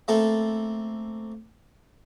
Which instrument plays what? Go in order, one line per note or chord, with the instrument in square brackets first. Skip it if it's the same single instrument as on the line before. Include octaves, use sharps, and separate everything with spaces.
[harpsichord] A3 A#3 C4 A4